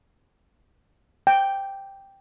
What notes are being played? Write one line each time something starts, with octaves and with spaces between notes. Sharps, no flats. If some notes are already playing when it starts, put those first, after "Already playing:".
G5